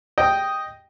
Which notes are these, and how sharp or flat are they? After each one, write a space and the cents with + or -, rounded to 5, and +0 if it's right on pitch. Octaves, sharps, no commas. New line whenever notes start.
D#5 +0 G5 +0